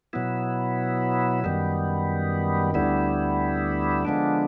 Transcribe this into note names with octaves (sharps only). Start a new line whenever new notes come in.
B2 F#3 B3 E4
F#2 D#3 G3 B3
D2 D3 G3 B3 E4
D3 F3 G#3 B3 D4